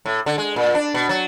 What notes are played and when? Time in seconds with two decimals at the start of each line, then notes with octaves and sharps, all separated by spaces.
0.05 A2
0.26 D3
0.38 G#3
0.56 A#2
0.75 D4
0.94 B2
1.09 F#3